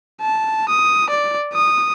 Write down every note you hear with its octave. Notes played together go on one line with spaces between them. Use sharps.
A5
D#6
D5
D#6